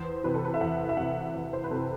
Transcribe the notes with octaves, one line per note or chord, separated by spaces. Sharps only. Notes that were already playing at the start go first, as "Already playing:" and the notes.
Already playing: E2 C5
C3 E3 B4
A4
B4
E5
E2 F#5
E5
C3 E3 F#5
E2
C5
B4
C3 E3 A4